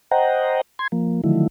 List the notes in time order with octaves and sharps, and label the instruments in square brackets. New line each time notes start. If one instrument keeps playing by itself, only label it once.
[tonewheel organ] C5 D#5 F#5 G5 A#5
C6 G#6
F3 A#3
D3 D#3 F3 F#3 A3 E4